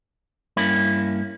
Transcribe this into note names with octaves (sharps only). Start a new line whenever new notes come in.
G2 A#3 C#4 E4 B5